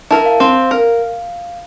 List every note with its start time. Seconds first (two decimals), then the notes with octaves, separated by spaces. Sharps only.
0.11 E4 A#4 A5
0.26 F5
0.40 C4
0.71 A#4